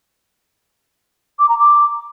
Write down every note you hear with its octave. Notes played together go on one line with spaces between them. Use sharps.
D6
A#5
D6